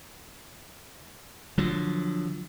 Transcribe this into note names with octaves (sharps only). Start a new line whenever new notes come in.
D3 F3 F#3